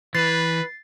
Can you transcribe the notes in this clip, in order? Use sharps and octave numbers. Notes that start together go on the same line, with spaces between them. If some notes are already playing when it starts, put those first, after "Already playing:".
E3 B4 A6 C7